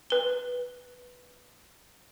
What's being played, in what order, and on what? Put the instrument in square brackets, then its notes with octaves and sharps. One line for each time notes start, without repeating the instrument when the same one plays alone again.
[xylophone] B4 G7